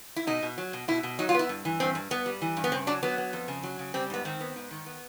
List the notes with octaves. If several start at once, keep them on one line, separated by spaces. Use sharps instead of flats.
E4
B2 D#4
B2
F#3
B2
B2 E4
B2
F#3 D#4
F4
B3 E4
G2
E3
G2 C4
G2
G2 B3
G3
E3
G2
B3
C#3 C4
F#3 D4
F#3 B3
B3
F2
C#3
F#3
C#3
G3 C4
G#2 B3
D#3 C4
B3
G#2
D#3
B3